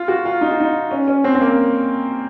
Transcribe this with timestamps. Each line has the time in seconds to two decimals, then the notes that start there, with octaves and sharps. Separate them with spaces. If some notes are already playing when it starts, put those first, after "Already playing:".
Already playing: F4
0.08 F#4
0.25 F4
0.41 D#4
0.51 F4
0.60 D#4
0.91 C#4
1.08 C#4
1.24 C4
1.35 C4
1.41 A#3